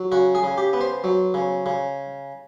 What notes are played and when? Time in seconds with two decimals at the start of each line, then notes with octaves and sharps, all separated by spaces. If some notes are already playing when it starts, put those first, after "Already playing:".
Already playing: F#3
0.12 C#3 F#4
0.35 G#4
0.43 C#3
0.57 G4
0.73 B3
0.81 C5
1.04 F#3
1.34 C#3
1.66 C#3